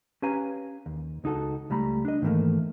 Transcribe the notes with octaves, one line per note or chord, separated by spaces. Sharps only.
C#4 G4 B4 F5 G#5 A#5
D#2
C#2 D#4 F#4 A4
C#2 G3 A3 A#5 B5
D4 D#5
G#2 D#3 E3 G3 A3 A#3